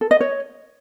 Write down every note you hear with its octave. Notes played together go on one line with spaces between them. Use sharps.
A4
D#5
C#5